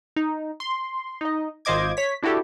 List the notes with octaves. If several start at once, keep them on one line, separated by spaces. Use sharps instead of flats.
D#4
C6
D#4 D#5
G#1 F4 C5 D#5 D6 G#6
C#5 B6
D4 E4 F#4 G4 A4